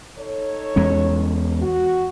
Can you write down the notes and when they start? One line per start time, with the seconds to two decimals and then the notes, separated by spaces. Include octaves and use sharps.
0.18 D#4 A4 C#5
0.76 E2 G#3 C#4
1.62 F#4